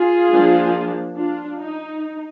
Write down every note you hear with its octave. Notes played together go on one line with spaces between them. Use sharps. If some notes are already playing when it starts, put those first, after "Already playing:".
Already playing: F4 G#4
F3 A#3 D4
D4 F4
D#4